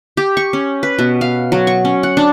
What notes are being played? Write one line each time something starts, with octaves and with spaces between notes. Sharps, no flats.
G4
C#6
C#4
B4
B2
F5
F#3
C#6
C#4
F#5
D4